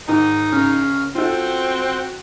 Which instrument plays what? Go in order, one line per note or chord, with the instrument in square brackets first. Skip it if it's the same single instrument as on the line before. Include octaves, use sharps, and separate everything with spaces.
[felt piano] G#2 D#3 [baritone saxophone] D#4 [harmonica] D#5
[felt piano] C#3 [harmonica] A#4 C#5 F5
[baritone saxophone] C4 [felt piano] F4 A4 [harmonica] F#4 G5